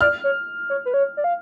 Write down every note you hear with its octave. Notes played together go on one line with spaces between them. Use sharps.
D5 F6
C#5
C#5
B4
C#5
D5
F5